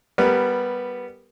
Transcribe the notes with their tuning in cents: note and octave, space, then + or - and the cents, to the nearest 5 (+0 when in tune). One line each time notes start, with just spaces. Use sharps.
G3 +0 B3 +0 A#4 -20